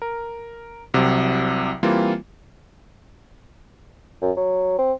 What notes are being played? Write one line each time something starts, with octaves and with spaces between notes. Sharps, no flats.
A#4
C2 C3 F#3
E3 G3 A#3 C4 F4
F#2
F#3
C4